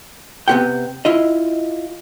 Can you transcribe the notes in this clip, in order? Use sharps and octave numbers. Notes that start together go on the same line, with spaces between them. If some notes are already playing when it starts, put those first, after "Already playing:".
C3 B3 C4 G4 F#5 G5
E4 F4 D#5